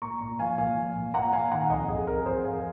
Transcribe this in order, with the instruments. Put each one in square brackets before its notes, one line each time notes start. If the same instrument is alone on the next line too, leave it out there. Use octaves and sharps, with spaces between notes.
[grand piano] A#2 A#5 C#6
A#2
F3 F5 G#5
A#2 F5 G#5
F3
A#2
A#2 F#5 A#5
A#2 F5 G#5
D#3 F#5 A#5
F2 D#5 F#5
F2 G#4
F2 A#4
F2 G#4 C5
F2 F5 G#5